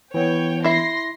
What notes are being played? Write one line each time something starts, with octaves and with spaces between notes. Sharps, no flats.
E3 B3 C#5 G5
E4 E5 C6 A#6 C7